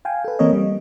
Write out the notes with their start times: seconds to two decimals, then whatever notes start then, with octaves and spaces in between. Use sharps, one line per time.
0.05 F5 G5 G#5
0.25 A4 B4
0.39 E3 A#3 C4 A#4 C#5 D#5
0.53 G3